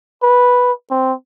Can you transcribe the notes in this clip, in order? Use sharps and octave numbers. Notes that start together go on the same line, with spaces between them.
B4
C4